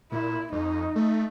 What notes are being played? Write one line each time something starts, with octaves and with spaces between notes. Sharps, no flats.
A#2 E4
F2 D#4
A3